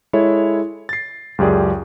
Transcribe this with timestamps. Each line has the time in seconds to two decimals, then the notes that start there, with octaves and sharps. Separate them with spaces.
0.13 G#3 E4 A4 C#5
0.89 A6 C7
1.38 C#2 F#2 G4 G#4 D5